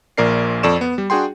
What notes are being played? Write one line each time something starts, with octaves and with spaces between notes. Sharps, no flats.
A#1 A#2 A#4 D5 C7
F2 A4 D5 C#6 E7
B3
G3
D4 F#4 G#4 G5 C6